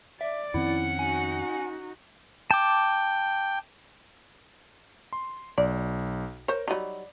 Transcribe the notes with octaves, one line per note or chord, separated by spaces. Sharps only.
D5 E5
F2 D#3 C4 C#4 E4 F#5
D#4 F#4 G#5
G5 A5 D6
C6
B1 D5
A#4 C5 C#5
F#3 G3 D#4 D5 B5